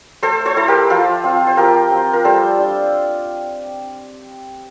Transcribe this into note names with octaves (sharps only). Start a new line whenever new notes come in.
A3 A4 C5
A4 C5
E4 A4
G4 A#4
F3 F4 A4
C4 F4
C5
F3 G4 A#4
C4 F4
A#4
G3 A4 C5
D4 F4